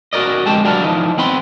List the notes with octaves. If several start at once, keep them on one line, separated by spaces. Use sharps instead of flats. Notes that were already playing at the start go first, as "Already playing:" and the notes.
F#4 A#4 D5 D#5
F2 D3 G#3 G4 A5
F#3 G3 D4 F4 A#4
E3 F3 D#4
E2 B3 C4 B5 C6